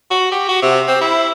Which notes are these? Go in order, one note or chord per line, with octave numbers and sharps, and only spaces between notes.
F#4
G4
F#4
C3
C4
E4